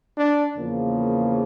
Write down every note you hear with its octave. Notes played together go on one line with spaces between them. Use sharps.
D4
E2 C#3 F3 A#3